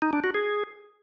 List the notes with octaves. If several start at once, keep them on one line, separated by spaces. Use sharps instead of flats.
D#4
D4
F#4
G#4